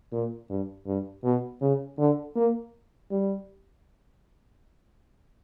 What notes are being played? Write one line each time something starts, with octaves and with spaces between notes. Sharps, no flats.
A#2
G2
G2
B2
C#3
D3
A#3
G3